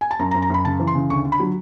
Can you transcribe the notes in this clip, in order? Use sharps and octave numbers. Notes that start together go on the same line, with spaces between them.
G#5
A5
F#2 A#5
A#5
F#2
A#5
F#2 B5
C#3 A5
E3
C6
C#3
D2 C#6
D3
B5
F#3